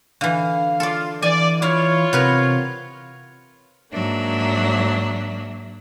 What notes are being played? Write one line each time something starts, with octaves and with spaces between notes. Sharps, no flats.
D3 E3 F5
F4 A4 D5
E3 D5 G#5
E4 F4 C#5 F5
C3 B3 A#4 B4
G#2 F#3 A#3 D4 E5